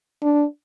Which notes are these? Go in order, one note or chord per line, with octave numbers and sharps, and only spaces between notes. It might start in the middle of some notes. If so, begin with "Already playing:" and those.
D4